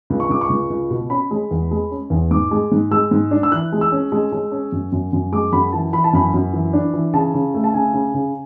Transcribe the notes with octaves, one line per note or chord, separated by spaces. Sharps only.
C#2
C#6
C#2 D6
C#6
C#2
C#2
B2
C#4 B5
G#3
E2
G#3
C#4
E2
G#2 D6
G#3
G#2
G#3 E6
G#2
D4
E6
E3 F#6
G#3
E6
C#4
G#3
G#3
C#4
F#2
F#2
F#2
G#3 D6
F#2 B5
E3 A5
E3 B5
A5
F#2 B5
F#2
E3
D4
E3
C#3 A5
C#3
A3
A5
C#3 G#5
C#3
C#3